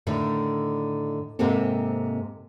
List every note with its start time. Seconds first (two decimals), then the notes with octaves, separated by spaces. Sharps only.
0.07 A2 D3 D#3
1.39 G#2 C3 A#3 C4 G4 A4